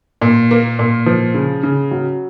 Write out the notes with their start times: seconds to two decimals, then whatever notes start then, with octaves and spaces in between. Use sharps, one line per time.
0.21 A#2
0.51 A#3
0.79 A#2
1.06 F3
1.34 C#3
1.63 C#3
1.91 F#3